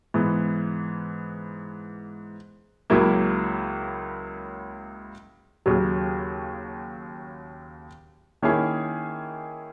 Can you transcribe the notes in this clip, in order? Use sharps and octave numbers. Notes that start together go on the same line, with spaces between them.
G#2 E3 B3
C#2 C#3 F#3 A#3 E4
D#2 C#3 F#3
D#3 A#3 C#4 E4 G#4